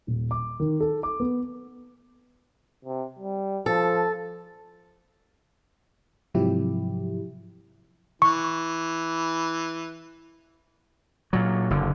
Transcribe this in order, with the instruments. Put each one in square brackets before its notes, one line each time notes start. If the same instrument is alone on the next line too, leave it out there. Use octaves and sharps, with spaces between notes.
[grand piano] D#1
D6
D#3
A4
D6
B3
[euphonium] C3
G3
[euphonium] F3 [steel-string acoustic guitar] A4
[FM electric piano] G#2 C3 F3 F#3 E4 G4
[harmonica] E3 [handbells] C#6
[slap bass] A#2 F#3
F#1 D3